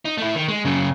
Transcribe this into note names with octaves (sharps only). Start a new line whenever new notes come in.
D#4
A3 E4
D#3
G#3
F#2 C#3